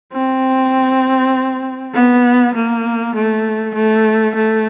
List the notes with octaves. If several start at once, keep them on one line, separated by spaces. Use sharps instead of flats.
C4
B3
A#3
A3
A3
A3